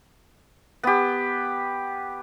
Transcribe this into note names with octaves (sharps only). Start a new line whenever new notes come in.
B3 G4